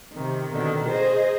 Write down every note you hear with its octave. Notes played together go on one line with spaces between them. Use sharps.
C3 D#3
B2 D3 D#3
G#4 C5 D#5